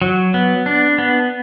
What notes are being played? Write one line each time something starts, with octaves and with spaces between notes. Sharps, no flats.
F#3
B3
D4
B3